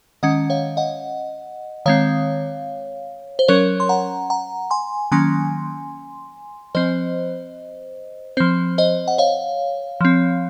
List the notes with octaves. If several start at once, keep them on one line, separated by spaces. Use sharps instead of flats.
D#3 G#3 C#4 D#5 F#5
C#5 F5
D#5 F#5
D#3 G#3 C4 C#5 F5
C5
F#3 C#4 A#4 C#5
C6
F#5 A#5
F#5 A#5
G#5 C6
D#3 F#3 A#3 C#4 G#5 C6
F3 C4 C5 D#5
F3 C4 C5
C5 D#5
F#5
C#5 F5
F3 C4